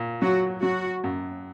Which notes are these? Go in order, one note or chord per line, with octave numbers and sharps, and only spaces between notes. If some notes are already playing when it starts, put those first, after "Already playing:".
Already playing: A#2
F#3 F#4
F#3 F#4
F#2